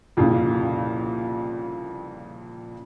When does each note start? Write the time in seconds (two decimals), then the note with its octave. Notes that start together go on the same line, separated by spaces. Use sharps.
0.17 C2 F2 A#2 C#3